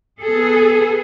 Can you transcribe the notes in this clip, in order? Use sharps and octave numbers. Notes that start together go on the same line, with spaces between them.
B3 G#4 A4